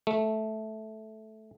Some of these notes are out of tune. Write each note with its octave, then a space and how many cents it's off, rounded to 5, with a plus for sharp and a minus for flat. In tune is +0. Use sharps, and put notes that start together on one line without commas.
A3 -10